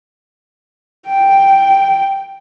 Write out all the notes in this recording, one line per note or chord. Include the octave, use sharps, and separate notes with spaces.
G5